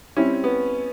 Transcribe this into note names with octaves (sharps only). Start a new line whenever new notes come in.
G3 C4 C#4 E4
B3